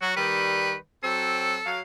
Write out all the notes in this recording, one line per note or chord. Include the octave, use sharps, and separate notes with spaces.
F#3 F#4
D#3 G3 B4
F#3 C4 A4
F#3 F5